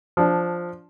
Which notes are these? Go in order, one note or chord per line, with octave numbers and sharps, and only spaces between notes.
F3 D4